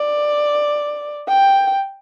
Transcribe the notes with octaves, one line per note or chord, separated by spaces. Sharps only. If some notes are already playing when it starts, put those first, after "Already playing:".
Already playing: D5
G5